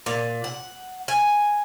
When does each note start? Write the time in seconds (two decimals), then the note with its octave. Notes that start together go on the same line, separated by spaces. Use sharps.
0.06 A#2
0.44 F#5
1.08 G#5